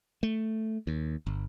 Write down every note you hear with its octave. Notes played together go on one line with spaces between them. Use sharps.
A3
D#2
G1